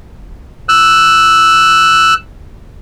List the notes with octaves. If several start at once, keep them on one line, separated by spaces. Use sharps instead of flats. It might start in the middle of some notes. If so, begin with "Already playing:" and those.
E6 F#6